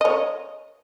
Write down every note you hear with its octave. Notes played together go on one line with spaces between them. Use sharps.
C#5 D#5